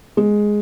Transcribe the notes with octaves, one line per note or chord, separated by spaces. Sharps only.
G#3